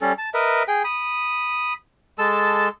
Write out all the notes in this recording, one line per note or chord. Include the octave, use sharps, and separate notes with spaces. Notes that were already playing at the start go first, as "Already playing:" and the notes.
G3 C#4 A4
A5
A#4 B4 D#5 E5
G#4 G5
B5 D#6
G#3 A4 A5 E6